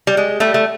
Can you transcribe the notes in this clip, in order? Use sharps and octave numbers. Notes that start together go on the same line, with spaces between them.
G3
G#3
G3 A3
A3